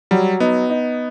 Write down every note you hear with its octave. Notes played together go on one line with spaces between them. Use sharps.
F#3 G3
B3 D#4
D#4